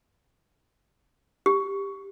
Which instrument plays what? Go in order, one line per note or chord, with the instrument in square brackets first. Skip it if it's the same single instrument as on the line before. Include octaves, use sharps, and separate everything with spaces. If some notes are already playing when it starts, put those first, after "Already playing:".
[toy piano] G4